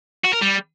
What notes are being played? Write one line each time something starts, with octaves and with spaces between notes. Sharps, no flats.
F#4
A#4
G3